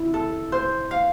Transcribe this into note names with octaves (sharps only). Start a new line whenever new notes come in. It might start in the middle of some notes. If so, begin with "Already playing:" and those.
Already playing: E4
A4
C5
F5